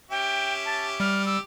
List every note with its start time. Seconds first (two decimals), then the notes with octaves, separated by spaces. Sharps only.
0.11 C#4 G4 E5 G5
0.65 A5
1.00 G3 F6
1.26 G4 E6